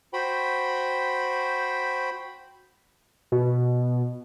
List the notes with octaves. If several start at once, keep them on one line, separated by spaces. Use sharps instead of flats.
F#4 C5 G5 B5
B2